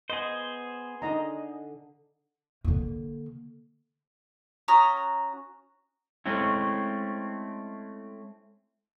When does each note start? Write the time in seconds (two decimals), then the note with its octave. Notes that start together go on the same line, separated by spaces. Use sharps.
0.10 B3 G#4 C5 D#5
1.02 D3 D#4 D#5 A#5
2.64 D3 A#3
4.68 C#4 F#4 A#5 D#6
6.26 G#3 A3 C4 C#4 E4